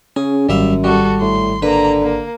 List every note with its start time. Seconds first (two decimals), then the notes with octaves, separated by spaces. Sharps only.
0.16 C#3 C#4 G#4
0.49 G#1 F#2 G3 E5 F5
0.84 G3 F#4 A4
1.21 A2 C6
1.62 D3 A#3 B4 A#5
2.03 A#3